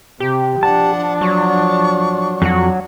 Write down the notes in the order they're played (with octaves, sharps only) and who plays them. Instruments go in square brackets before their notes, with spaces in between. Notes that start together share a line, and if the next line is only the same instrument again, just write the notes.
[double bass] C3 [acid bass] G4
[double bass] F3 D4 [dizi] F#5 [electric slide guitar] A5
[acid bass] F#3 [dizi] C#6
[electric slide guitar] F2 F#4 [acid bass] F#3